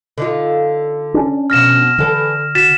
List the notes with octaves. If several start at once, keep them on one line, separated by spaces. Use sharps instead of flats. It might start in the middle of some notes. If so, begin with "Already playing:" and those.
D3 D#4 F4
C#4 D4
F2 B2 F6 A#6 E7
D3 E3 A4
F#4 A6 B6 E7